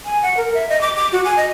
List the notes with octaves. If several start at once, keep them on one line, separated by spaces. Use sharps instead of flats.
G#5
F#5
A#4
E5
D#5
D6
D6
F#4
G#5
D#5